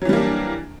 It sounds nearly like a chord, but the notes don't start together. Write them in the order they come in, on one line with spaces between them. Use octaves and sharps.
F#3 E3 G3 A#3 D4